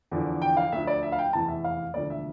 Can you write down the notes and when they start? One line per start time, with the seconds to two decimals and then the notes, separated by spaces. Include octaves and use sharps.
0.12 E2 D3 F3
0.42 G5
0.57 F5
0.72 D2 D3 F3 E5
0.87 D5
1.03 E5
1.12 F5
1.18 G5
1.33 F1 E2 E3 A5
1.48 E5
1.64 F5
1.94 E1 D2 D3 F3 D5
2.10 E5